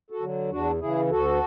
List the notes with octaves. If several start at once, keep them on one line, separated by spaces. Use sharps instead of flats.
F#4 A4
D3 F#3
E2 D4 F#4
C#3 E3 E4 G#4
D2 F#4 A4